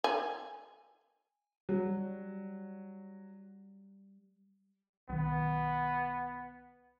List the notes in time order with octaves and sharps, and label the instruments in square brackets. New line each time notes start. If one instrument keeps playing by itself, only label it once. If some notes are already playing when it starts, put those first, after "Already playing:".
[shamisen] G#5
[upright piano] F#3 [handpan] G3
[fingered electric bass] B1 D#3 [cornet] B3